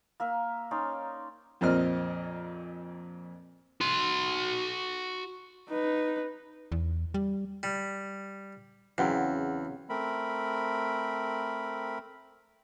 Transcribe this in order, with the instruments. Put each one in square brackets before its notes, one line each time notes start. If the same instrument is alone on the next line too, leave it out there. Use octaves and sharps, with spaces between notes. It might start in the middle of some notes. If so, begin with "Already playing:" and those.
[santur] A#3 A#4 E5
C#4 D#4 D5 C6
[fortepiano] F2 A#2 C4 A#4 D#5 F6
[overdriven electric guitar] F#4 C6
[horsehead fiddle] D#4 B4
[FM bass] E2
G3
[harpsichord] G3
[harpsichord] E2 [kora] C#3 F#3 C4
[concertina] A3 C4 A#4 B5